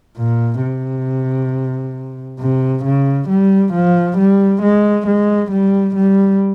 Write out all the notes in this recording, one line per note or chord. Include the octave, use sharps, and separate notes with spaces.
A#2
C3
C3
C#3
G3
F3
G3
G#3
G#3
G3
G3